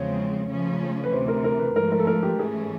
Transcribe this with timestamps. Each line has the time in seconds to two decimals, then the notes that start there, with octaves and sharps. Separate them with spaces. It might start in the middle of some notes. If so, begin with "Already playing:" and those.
Already playing: E2 C#3 F3 G#3 C4 C#5
0.49 C#3 F3 A3 C#4
1.04 B4
1.12 D2 C3 E3 C5
1.28 A#4
1.44 A#4
1.59 B4
1.76 G#2 F3 A3 A#4
1.92 A#4
1.99 A4
2.07 A#4
2.23 G4
2.39 G#2 E3 A3 C#4 G#4